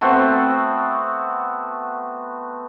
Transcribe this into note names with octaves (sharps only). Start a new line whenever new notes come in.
A3 B3 C4 F#4